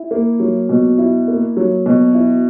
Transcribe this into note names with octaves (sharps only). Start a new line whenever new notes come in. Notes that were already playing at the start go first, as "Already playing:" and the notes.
Already playing: E4
A#3
F#3
B2
E4
A#3
F#3
B2
E4